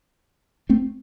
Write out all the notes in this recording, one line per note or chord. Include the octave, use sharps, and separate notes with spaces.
A3 C4